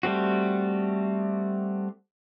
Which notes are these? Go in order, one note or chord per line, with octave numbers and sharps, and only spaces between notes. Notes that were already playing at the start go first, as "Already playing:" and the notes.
G3 A3 C4 F#4